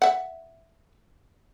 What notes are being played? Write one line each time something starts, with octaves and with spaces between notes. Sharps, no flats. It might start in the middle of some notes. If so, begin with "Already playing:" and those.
E5 F#5